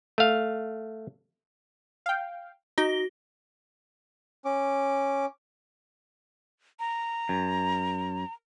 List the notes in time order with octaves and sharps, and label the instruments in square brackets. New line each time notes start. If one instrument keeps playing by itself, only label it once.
[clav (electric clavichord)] A3 F5
[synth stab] F5 G5
[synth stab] D#4 [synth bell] F#4 A#6 G7
[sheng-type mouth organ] C#4 D6
[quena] A#5
[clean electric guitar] F#2